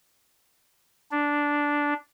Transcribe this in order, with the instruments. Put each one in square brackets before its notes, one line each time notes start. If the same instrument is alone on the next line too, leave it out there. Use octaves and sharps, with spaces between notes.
[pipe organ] D4